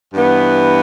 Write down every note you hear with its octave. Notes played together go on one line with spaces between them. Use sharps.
G2 E3 B3